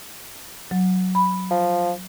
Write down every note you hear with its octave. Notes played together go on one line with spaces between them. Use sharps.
F#3
B5
F3